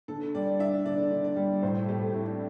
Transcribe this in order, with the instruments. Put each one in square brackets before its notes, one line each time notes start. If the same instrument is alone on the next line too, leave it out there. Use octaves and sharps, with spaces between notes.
[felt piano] D3 [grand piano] A4
[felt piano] G3 [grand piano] D5
[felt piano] D4 [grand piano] E5
[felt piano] D3 [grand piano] D5
[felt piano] D3
[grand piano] D5
[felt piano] G3
[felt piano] A2 [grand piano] C5
[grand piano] A4
[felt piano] A3 [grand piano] G4
[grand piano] C4 [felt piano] E4
[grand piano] D4